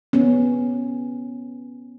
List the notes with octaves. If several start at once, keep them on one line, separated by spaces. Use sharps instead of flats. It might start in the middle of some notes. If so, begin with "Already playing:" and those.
B3 C#4